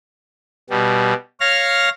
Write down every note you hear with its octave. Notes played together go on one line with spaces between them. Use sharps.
B2 G3
C#5 F5 F6 A#6